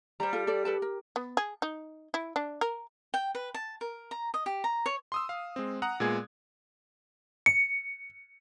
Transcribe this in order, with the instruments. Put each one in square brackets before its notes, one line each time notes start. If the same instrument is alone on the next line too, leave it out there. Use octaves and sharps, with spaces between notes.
[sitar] G3 [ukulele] C5 A#5
[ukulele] F4 A4
A4 D5
A4 B4 A5
A#4
[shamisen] B3
G#4
D#4
E4
D4
A#4
[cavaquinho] G5
B4
A5
A#4
A#5
D#5
G4
A#5
C#5
[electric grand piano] C6 D#6 E6
F5
G#3 C4
F#5 A#5 D#6 F#6
A#2 G#3 B3 G#4 G#6
C#7